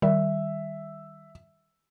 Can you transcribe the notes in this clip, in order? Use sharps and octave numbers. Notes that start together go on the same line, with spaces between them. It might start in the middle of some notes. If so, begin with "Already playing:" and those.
D#3 G3 E5